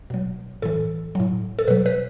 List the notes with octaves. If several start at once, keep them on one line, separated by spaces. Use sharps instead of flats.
B2 F#3
A2 E3 A4
A2 F#3
A4
B2 F#3 B4
B4